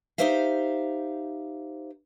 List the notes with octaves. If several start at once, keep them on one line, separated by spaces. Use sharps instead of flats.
D#4 E4 G4 C5 E5 F5